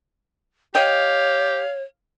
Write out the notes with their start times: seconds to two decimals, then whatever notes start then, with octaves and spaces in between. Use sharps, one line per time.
0.75 G4 C#5 D#5 F5 G5